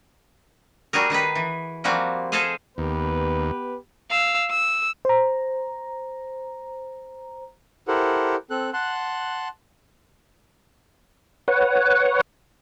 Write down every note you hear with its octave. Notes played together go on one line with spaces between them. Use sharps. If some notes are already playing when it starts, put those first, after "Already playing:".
G3 F#4 G#4 A#4
D#3 D#4 G#4 B4
E3
F3 G3 A#3 C4 F#4
G#4 A4 C5 D#5 F5 G#5
D#2 B3 G4 B4
F5 E6
E6
C5 A#5
E4 G4 A4 A#4 C5 F#5
C4 A4 F#6
F#5 A5 C6 F#6
B4 C#5 F#5